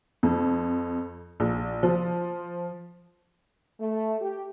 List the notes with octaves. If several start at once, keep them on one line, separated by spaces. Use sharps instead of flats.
F2
A#1
F3
A3
G4